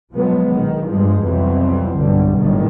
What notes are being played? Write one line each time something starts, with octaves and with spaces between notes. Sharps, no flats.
B2 F3 F#3 G#3 B3
A#1 D#3
G2 F3 G#3
C2 F2 B2 E3 F#3 C4
B1 G2 B2 D3 G3
G1 A2 D3 D#3 F#3 G3